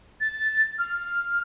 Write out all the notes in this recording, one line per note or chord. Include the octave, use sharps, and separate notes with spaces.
A6
F6